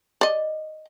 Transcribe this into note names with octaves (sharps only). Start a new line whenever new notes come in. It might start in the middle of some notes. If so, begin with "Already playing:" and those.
D5 D#5